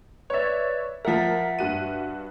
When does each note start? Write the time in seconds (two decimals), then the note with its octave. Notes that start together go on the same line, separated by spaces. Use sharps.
0.30 B4 C#5 D5 E5
1.05 F3 A#4 E5 F#5 B6
1.59 G2 F#4 D#7